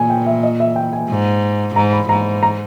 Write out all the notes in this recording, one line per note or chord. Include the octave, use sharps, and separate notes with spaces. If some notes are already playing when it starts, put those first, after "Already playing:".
Already playing: A#2 G#5
G5
E5
D#5
E5
G5
G#5
G#2
G#2 A#5
B5
G#2 A#5
A#5